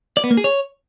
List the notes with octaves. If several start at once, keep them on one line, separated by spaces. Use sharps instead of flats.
D5
B3
A#3
G#4
C#5